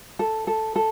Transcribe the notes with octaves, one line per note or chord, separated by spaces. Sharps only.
A4
A4
A4